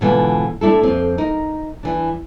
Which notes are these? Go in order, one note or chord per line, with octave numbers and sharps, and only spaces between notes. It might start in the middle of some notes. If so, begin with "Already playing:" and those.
G#2 B2 D3 E3 B3 F4
A3 D4 E4 A4
F2 C4
D#4 A#4
E3 D4